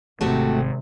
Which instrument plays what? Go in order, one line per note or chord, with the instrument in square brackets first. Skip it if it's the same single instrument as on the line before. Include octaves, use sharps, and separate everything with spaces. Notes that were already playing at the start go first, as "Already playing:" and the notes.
[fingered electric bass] G#1 [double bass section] C3 [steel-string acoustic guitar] A3 F#4 G4